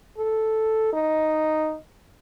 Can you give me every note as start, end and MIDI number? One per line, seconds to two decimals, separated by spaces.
0.18 0.89 69
0.93 1.75 63